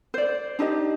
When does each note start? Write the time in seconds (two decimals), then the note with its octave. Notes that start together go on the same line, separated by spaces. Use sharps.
0.14 C5 D5
0.59 D4 D#4 G4 D#5